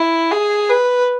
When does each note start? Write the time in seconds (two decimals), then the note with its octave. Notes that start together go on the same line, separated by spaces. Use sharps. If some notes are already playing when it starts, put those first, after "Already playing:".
Already playing: E4
0.31 G#4
0.69 B4